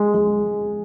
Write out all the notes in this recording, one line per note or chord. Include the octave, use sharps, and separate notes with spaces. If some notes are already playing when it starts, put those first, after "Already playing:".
Already playing: G#3
G#3